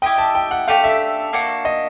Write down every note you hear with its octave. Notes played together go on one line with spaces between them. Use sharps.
E4 G4 B4 D#5 G5
A5
G5
F#5
A3 D4 G4 F5
E5
A#3 D4 F#4
D#5